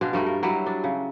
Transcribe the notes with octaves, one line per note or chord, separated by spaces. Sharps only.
B2 G#3 D4 F5
G2 G3 A3 A#4
A#4
F#3 G3 E4
D4
C#3